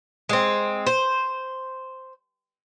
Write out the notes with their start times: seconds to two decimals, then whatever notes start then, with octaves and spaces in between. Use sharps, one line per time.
0.29 G#3 C4
0.86 C5